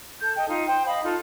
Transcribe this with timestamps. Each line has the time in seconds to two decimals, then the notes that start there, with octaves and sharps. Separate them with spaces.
0.20 A4 G6
0.36 A4 D#5 G5
0.47 D#4 F4
0.66 C5 G5
0.86 D#5 F5 B5 D#6
1.03 D#4 F4 A4